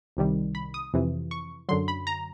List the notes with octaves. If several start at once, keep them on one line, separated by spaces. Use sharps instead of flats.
C2 C3 D#3 G3
B5
D#6
F2 C3 E3
C#6
F#2 D3 F#3 C6
B5
A#5